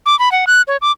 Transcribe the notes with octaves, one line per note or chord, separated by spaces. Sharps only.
D6
B5
F#5
F#6
C#5
D6